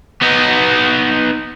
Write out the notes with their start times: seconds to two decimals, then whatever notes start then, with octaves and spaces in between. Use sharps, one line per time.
0.21 B3 D#4